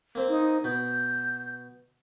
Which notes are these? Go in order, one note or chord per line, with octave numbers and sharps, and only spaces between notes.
A#3 C4 C5
D#4
B2 G6